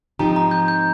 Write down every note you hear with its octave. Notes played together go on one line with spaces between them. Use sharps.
G#2 F3 C4 D#4 G4 A#5
A#5
G6
G6